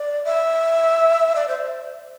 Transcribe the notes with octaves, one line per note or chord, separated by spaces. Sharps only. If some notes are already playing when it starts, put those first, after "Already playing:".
Already playing: D5
E5
D5
C5